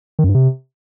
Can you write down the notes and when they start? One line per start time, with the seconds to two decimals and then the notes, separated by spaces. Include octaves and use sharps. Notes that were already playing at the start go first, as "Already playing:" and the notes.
0.19 D#3
0.24 F#2
0.29 G2
0.35 C3